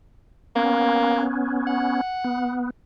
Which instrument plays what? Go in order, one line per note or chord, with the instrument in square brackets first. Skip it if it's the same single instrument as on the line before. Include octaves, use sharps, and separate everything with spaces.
[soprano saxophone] A#3 [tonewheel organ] B3 C#4
[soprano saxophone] F#5
[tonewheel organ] B3